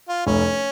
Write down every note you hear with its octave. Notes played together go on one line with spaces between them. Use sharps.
F4
F1 C#4